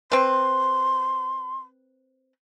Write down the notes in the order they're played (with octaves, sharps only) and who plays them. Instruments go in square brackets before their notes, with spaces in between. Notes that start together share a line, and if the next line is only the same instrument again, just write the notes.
[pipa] C4 B4 [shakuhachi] C6